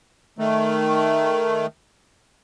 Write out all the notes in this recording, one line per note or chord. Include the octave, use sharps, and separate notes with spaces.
D#3 A3